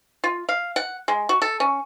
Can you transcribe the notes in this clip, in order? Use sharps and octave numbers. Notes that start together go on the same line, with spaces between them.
F4
F5
F#5
G#3
F#4
A4
C#4